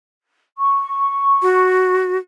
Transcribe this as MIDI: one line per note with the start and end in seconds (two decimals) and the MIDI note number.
0.58 1.94 85
1.42 2.18 66